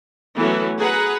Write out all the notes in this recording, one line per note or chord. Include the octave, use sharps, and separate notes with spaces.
E3 F#3 A3 B3 C#4 F#4
G#4 B4 F#5 A#5